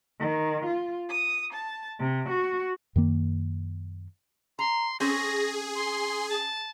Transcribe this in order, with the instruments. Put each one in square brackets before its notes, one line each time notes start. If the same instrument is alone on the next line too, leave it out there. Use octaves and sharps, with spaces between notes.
[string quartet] D#3
F4
D#6
A5
C3
F#4
[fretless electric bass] F#2 D#3 A#3
[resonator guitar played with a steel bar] A#5 [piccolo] C6
[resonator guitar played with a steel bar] C4 C#4 A4 [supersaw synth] G#4 [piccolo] A#6
[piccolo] C6
A5